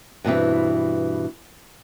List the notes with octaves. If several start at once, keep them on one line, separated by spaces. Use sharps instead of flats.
G2 B2 E3 C4